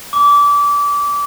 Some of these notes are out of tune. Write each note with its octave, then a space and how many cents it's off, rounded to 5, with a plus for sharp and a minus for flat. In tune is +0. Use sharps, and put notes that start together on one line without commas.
D6 -25